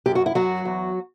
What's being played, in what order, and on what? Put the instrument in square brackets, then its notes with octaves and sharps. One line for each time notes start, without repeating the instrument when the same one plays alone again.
[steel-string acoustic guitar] F#2 G4
F#4
E4
F#2 F#3 F#4
E2